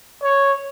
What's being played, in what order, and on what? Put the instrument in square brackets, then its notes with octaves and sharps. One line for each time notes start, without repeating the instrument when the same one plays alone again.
[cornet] C#5